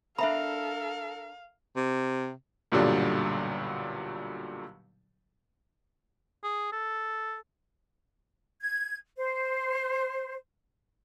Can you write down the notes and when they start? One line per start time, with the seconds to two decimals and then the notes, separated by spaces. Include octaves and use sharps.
0.18 D4 A4 A#4 E5 F5 A#5 B5
1.77 C3
2.72 B1 G2 A#2 D3 F#3 G3
6.44 G#4
6.72 A4
8.60 G#6
9.16 C5